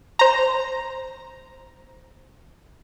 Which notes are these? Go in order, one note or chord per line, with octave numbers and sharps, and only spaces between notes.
C5 A#5